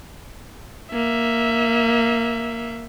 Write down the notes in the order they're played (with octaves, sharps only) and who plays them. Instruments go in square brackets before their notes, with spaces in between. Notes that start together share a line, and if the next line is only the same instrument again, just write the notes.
[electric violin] A#3 E5